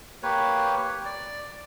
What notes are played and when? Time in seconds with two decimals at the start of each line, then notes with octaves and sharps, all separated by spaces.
0.23 A#3 G4 B4 C#5
1.05 D5